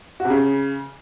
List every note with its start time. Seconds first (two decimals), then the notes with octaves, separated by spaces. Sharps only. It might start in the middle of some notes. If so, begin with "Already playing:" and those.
0.20 F#4
0.25 C3
0.30 C#3